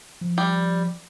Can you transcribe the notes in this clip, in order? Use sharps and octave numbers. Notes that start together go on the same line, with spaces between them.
F3
G3